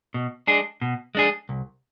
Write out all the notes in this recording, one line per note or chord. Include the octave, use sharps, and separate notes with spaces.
B2
G#3 D4 G#4
B2
G#3 D4 G#4
C2